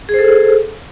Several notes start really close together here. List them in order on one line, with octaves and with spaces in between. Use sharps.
G#4 C5 A4